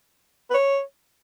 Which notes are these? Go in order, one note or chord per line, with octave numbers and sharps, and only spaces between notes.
B4
C#5